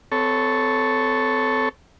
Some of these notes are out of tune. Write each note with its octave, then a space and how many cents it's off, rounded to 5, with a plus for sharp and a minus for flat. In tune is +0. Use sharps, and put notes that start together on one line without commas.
C4 -35 A4 +0 C#5 +0